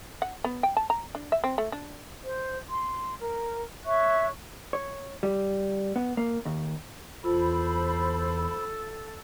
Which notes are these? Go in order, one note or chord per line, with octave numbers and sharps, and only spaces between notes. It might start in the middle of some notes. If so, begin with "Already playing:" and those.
F#5
B3
G5
A5
A#5
D4
E5
C4
A3
D4
C5
C6
A#4
C#5 E5 C#6 F#6
C#5
G3
B3
A#3
D#2
E2 F4 A4 C5 B5